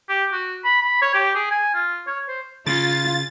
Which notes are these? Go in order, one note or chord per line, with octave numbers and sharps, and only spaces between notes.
G4
F#4
B5
B5
C#5
G4
G#4
G#5
F4
C#5
C5
C#3 F4 A6